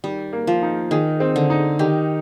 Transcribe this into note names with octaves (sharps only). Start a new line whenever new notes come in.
D#3 G3
A#3
F3
D#4
D#3 G#4
C4
D3
D#4
D#3 G4